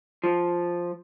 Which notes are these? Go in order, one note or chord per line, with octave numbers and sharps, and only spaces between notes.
F3